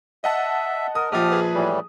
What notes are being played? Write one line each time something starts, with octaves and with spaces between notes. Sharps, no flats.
D#5 E5 F#5 A5
A#4 D#6
A#1 F3 G4 D#6 F6
G#4 B4
A2 E3 G3